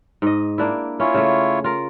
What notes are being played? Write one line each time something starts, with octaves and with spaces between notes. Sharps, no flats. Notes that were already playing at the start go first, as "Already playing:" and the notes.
G#2 D#5
A#3 D4 E4
C#4 E4 F4 C#5
C#3 A3
F4 A#4